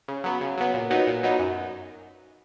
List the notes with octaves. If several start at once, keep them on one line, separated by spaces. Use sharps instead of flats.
C#3
F#3 B3
C#3
F#3 B3
A#2
F#3 B3 D#4
A#2
F#3 B3 D#4
F#2